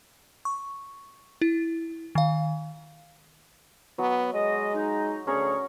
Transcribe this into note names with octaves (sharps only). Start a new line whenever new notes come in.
C#6
E4
D#3 F5
F#3 B3
G#3 D#5
D#4
D2 C#4 G#4 A#4 C#5